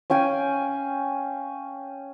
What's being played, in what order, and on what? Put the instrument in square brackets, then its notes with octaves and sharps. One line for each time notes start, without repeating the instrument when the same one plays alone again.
[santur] C#4 F5 G5 G#5